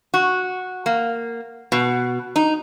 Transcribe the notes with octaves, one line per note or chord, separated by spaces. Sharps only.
F#4
A#3
B2
D#4